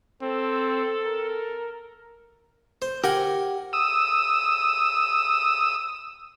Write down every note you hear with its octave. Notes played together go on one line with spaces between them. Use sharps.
C4 A4
A#4
C5
G4 A#4 F#5 G#5
D#6 E6